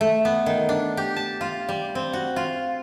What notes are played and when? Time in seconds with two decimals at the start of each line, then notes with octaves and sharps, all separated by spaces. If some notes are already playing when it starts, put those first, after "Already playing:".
0.01 A3
0.25 B3
0.46 D#3
0.69 D4
0.97 G4
1.16 A5
1.41 F4
1.69 G3
1.95 C4
2.13 F#4
2.36 F4